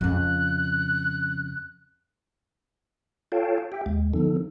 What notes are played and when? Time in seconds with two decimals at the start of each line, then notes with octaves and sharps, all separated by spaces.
0.01 F2 C#3 F#6
3.32 F4 A4 C#5 F5 G5 A5
3.72 G4 E5 G5
3.86 D#2 G#3
4.13 D3 F3 B3 D#4 A4